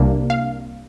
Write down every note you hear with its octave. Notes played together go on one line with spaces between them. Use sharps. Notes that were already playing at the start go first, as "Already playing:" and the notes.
Already playing: C2 C3 A#3 D4
F5